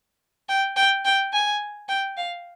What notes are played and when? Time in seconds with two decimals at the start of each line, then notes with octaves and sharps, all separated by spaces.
0.49 G5
0.76 G5
1.05 G5
1.33 G#5
1.89 G5
2.17 F5